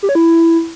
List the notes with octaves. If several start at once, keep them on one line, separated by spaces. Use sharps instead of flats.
G4
C#5
E4